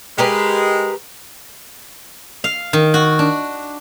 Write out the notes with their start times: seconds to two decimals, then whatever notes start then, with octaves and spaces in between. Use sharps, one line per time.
0.18 G#3 G4 A#4 B4
2.44 F5
2.73 D#3
2.94 F#4
3.19 D4